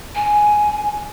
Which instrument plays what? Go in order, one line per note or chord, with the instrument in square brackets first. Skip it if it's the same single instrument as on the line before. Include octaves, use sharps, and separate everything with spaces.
[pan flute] G#5